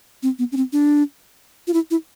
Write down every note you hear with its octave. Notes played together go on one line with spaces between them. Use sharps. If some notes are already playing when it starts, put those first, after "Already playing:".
C4
B3
C#4
C4
D4
F4
E4
E4